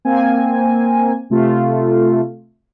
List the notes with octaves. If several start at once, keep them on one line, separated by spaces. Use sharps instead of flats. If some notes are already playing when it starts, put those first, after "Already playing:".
A#3 C4 G#5
C3 A3 F4